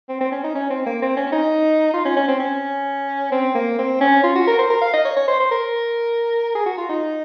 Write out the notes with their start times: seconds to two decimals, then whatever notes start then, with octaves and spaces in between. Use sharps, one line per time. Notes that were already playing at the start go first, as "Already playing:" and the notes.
0.09 C4
0.21 C4
0.32 C#4
0.44 D#4
0.55 C#4
0.70 C4
0.86 A#3
1.02 C4
1.16 C#4
1.26 C#4
1.32 D#4
1.94 F4
2.05 C#4
2.16 C#4
2.28 C4
2.40 C#4
3.31 C4
3.55 A#3
3.78 C4
4.01 C#4
4.23 F4
4.35 F#4
4.47 A#4
4.59 C5
4.70 A#4
4.81 F5
4.93 D#5
5.05 C#5
5.16 C#5
5.28 C5
5.39 C5
5.51 A#4
6.55 G#4
6.66 F#4
6.78 F4
6.89 D#4